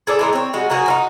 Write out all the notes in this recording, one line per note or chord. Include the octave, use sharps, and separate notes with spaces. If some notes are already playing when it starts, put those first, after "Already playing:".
G#4 A4 D5
E3 G#3 D#4
C4 C#5
G3 G#3 F#4
F#3 A#3 F#4 G#4
D#4 F4 F#4